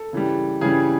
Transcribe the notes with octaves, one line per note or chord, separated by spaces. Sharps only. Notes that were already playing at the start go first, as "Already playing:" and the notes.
Already playing: A4
C#3 E3 G3
C#3 E3 G3 G#4